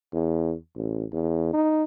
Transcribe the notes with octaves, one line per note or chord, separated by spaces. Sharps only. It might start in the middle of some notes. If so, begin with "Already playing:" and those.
E2
A1
E2
D#4